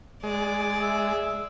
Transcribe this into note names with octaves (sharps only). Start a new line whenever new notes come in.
G#3 D5
E5